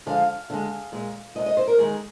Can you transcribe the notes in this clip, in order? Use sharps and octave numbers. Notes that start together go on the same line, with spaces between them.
D3 F3 G#3 F5
D3 G#3
A#2 G#3
C3 F3 G#3 D#5
D#5
C5
A#4
D#3 G#3 G#4